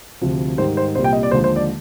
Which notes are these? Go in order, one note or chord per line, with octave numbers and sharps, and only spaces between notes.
D2 C3 F3
G#2 D#3 G3 C5
C5
C2 A#2 G3 C5
G5
D#5
D5
D#2 D3 F3 G#3 C5
C5
D5